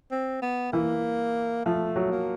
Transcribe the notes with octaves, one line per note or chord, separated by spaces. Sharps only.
C4
B3
E3 A#3
F3 A3
F#3
A#3